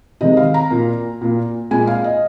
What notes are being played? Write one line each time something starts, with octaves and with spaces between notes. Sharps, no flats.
C3 D#3 G#3 D#5
F5
A#5
A#2 A#3
A#2 A#3
A#2 G#3 G#5
F5
D#5